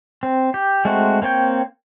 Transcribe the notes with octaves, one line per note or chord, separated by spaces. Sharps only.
C4
G4
G#3 A3 C4 F#4
A#3 C4 C#5 G5